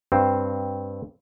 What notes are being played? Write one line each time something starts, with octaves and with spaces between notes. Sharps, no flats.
G2 C4